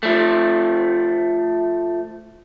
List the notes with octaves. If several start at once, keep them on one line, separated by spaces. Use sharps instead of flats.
F3 A3